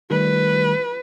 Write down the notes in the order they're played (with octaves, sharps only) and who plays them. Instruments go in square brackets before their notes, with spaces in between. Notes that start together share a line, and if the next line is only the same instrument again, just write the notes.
[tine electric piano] D#3 G3 A3 [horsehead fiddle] B4